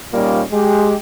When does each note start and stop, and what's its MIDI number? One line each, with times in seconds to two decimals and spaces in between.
0.12 0.41 46
0.12 0.41 55
0.12 0.41 58
0.12 0.41 61
0.12 0.41 63
0.12 0.41 65
0.52 0.93 56
0.52 0.93 67